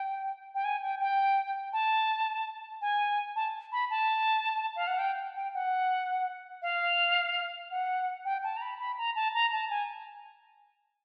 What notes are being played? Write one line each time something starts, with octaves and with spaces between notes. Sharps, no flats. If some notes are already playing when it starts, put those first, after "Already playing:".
Already playing: G5
G5
G#5
G5
G5
A5
G#5
A5
B5
A5
F5
F#5
G5
G5
F#5
F5
F#5
G5
A5
A#5
B5
B5
A#5
A5
A#5
A5
G#5